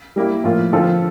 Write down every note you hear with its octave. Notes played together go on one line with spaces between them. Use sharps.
G3 A#3 E4
A2 F3 A#3 F4
D3 F3 C4 F4 A4